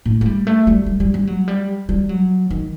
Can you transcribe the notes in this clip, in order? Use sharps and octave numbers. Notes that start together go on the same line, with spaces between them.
A2
A3
G3
A3
G3
G3
G3
G3
F#3
G3
G3
F#3
D#3